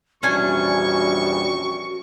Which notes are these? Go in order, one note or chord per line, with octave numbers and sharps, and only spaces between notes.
A#1 E2 G3 C#4 D4 F#4 G#5 C#6